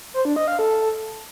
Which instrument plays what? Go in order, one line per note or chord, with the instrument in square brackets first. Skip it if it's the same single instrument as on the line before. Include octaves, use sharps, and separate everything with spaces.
[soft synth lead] C5
D4
D#5
F5
A4